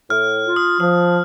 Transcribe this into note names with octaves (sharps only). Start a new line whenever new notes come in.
A2 F6
F4
D#6
F3 D#6